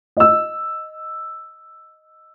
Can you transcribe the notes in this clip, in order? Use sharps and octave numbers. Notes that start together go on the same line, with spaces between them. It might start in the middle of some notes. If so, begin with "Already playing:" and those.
D#5 E6